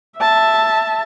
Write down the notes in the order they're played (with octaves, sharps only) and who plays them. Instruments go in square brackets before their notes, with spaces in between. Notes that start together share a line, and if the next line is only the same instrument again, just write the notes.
[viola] E5 A5